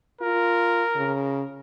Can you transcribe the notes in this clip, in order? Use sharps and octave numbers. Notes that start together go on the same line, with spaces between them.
F4 A#4
C#3